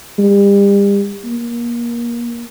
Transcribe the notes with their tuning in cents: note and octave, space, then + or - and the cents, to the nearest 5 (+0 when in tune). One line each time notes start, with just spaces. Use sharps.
G3 +35
A#3 +25